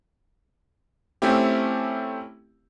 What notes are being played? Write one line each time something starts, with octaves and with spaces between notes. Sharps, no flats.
A3 C4 C#4 E4 G4